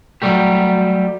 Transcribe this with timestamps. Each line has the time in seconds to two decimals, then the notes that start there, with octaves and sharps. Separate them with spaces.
0.22 F#3 G3 A3 G4